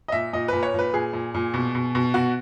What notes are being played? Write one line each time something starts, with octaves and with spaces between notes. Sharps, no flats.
D#5
A#2 E5
A#2 D#5
A#2 B4
C#5
A#2 B4
A#2 G#4
A#2
A#2
B2
B2
B2
B2 F#4